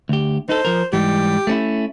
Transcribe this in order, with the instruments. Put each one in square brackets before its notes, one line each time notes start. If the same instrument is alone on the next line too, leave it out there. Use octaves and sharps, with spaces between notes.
[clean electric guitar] D2 G4
[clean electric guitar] D#4 A4 [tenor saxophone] C5
[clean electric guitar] F3 A#4
[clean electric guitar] G#2 E3 G3 [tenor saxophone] G4
[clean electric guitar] A3 C#4 E4